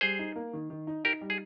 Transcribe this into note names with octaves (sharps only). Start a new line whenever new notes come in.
G3 G#4 C5
D#4
A#3
D#3
D#3
D#4
D#4 G4 A#4
G3
G#4